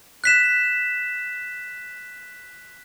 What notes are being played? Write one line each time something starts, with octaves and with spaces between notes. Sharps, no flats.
F#6 B6 E7